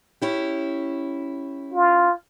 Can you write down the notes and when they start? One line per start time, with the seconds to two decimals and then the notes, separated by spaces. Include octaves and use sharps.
0.22 C#4 E4 G4
1.74 F4